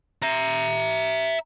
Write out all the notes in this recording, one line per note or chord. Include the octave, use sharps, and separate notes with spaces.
E5 A#5